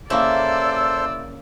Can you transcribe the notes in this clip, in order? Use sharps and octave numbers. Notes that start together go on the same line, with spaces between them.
C#3 A#3 E4 A4 C5 D5 E6